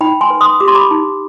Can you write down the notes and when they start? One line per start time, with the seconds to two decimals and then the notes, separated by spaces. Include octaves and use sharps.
0.01 D#4 G5 B5
0.21 G#5 C6
0.30 B4
0.41 C6 D#6
0.60 G4 D6
0.68 C6
0.75 B5 D6
0.91 D#4